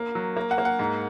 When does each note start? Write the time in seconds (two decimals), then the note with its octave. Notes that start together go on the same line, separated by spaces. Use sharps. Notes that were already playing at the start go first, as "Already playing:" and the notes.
Already playing: A#3
0.15 F#3
0.37 A#3
0.51 F#5
0.58 A#3
0.65 F#5
0.79 G#2